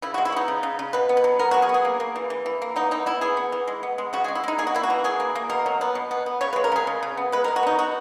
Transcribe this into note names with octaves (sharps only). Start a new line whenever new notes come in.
C#3 E4
G#3 F#4
E4
B3 D#4
C#3
C#3
C#3
B2 B4
B3
B4
F#3
B3 A#4
F#3 F#4
G#4
B3
G#4
A#3
A#3
E3
E3
E3
A#3
B3 D#4
E3 D#4
B3 E4
E3 G#4
B3
E3
G#3
B3
G#3
C#3 F#4
G#3 G#4
E4
G#3 D#4
A#3 G#4
F#4
A#3 E4
F#4
E3
E3 G#4
A#3
A#3
B2 A#4
F#3
B3
B2
B3
B3
C#3 C#5
G#3 B4
A#4
C#3 G#4
C#3
C#3
B3
G#3 B4
B2 A#4
F#4
B3 D#4
B3 F#4